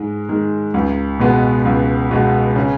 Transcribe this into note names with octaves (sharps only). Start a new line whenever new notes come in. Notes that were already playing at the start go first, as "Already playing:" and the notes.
Already playing: G#2 G#3
D#3 G#3
C#2
B2 G#3 B3
C#2
B2 G#3 B3
C#3